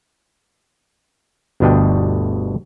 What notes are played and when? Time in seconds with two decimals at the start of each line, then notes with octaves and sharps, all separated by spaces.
1.60 G1 D2 B2 D4 D#5 G5